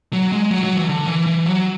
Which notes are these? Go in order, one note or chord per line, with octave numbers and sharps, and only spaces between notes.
F#3
G#3
F#3
F#3
E3
D3
E3
E3
F#3